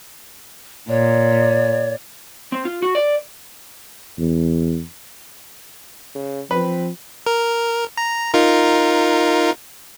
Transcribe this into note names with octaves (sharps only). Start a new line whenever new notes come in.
A#2 C#5 D5
C4
F4
F#4
D5
E2
C#3
F3 C4 B4
A#4
A#5
D#4 F4 A#4